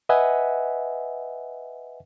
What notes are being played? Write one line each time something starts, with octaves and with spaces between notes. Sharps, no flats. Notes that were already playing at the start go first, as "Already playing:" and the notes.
B4 D#5 E5 F#5 G#5